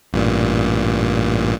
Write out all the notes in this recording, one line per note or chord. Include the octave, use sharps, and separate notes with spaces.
A1 G2 A#2